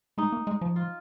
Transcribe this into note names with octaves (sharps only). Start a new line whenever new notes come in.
G#3 D#4
A#3
G#3
F3
F4